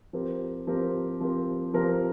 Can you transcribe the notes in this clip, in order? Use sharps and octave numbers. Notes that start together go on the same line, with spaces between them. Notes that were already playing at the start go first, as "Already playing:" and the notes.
F3 C4 G4 A#4
F3 C4 G4 A#4
F3 C4 G4 A#4
F3 C4 G4 A#4